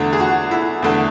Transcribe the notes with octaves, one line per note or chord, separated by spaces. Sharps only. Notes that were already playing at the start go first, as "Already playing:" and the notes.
Already playing: E2 D3 A3
G#4
F#4
E4
E2 D3 A3